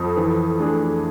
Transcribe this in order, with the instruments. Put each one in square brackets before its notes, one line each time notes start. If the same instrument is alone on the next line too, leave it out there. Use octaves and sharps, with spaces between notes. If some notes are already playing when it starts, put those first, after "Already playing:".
Already playing: [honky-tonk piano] F2
[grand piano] E3
A3 D4 G#4